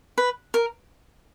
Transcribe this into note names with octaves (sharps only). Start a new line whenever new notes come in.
B4
A#4